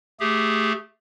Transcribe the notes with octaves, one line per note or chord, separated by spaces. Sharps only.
A3 G4 G#4